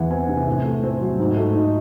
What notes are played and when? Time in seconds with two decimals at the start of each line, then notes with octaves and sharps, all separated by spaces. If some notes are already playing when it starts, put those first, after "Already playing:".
Already playing: E2 E3 F#5
0.10 C4 G#5
0.29 C3
0.47 A2
0.65 A3
0.83 C4
1.01 F#3
1.19 G#2
1.37 A3
1.55 D#4